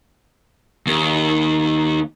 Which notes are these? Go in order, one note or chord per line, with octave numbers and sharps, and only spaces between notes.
D#2